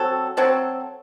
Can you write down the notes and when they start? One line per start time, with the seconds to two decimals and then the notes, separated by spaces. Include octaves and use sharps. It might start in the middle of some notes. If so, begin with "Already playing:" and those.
Already playing: F#3 C4 F#4 A4
0.37 F#3 C4 F#4 A4